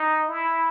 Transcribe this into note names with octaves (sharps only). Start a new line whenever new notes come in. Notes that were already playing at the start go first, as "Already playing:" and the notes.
Already playing: D#4
E4